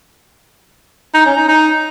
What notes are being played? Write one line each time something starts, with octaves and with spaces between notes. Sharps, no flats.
D#4
C#4
D#4
D#4